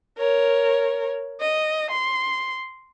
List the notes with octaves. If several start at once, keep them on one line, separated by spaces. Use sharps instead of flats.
A#4 C#5
D#5
C6